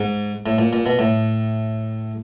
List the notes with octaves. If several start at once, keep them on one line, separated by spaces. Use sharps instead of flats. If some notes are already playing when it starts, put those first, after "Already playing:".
Already playing: G#2
A2
A#2
A#2
B2
A2